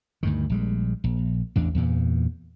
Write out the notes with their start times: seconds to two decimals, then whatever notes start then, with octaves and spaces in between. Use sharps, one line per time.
0.23 D2 G2 D#3
0.50 A#1 G3 G#3
1.04 A#1
1.56 A1 E2 D4
1.75 E2 G2 A#2